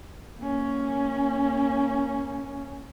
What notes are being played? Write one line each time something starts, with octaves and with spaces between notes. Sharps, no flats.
A#3 C#4